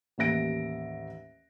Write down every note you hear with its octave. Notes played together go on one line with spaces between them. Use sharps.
A1 D#2 E5 A#6 D7